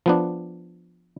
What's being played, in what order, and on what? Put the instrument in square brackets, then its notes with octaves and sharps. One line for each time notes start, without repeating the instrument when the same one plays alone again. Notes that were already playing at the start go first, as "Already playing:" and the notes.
[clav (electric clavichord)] F3 B3 D4